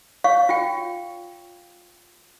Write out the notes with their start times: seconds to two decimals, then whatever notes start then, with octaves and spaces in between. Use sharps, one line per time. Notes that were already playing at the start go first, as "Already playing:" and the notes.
0.24 C#5 F5 C#6
0.49 F4 G5